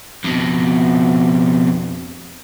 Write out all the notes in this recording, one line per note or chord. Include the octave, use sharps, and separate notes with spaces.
F2 B2